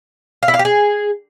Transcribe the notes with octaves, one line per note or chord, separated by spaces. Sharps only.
F5
E4
F5
G4
G#4